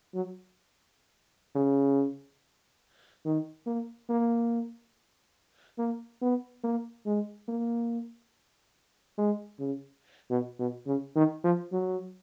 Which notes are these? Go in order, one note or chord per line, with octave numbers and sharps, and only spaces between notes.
F#3
C#3
D#3
A#3
A#3
A#3
B3
A#3
G#3
A#3
G#3
C#3
B2
B2
C#3
D#3
F3
F#3